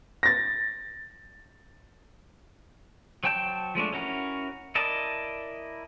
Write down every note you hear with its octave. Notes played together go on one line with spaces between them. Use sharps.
A6 A#6
F#3 C5 G5 A5 G6
F3 G#3 A3 D4
C#4 E4 F#4 A#4
E4 A#4 D5 D#5 A5